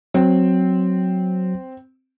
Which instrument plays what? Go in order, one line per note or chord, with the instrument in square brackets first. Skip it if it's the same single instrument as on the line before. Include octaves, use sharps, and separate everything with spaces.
[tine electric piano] F#3 [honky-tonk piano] C4